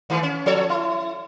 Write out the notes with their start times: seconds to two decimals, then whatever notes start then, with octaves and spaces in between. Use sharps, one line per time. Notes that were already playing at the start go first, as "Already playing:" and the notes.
0.10 D#3 E3 A3
0.23 C#4
0.46 F3 A4 C#5
0.69 E4